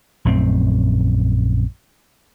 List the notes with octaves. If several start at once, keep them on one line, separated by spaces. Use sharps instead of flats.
A#1 F#2 A3 C4